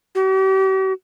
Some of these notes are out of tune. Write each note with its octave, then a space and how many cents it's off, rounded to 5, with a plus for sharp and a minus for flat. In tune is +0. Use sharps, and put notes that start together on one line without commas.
G4 -45